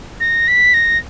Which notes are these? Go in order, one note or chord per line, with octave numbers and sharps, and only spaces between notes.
A#6
B6
A#6